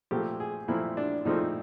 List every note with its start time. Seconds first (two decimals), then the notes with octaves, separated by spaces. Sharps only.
0.11 A#2 F3 A3 C4 G4
0.40 G#4
0.68 A#2 F3 A3 C4 E4
0.97 D4
1.25 A#2 F3 A3 C4 D#4